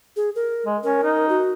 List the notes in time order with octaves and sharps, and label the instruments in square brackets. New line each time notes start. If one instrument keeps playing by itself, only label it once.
[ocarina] G#4
A#4
[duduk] G#3
[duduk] C#4 [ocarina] A#4
[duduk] D#4
[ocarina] F#4